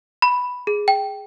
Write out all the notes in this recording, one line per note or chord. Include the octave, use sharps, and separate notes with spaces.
B5
G#4
G5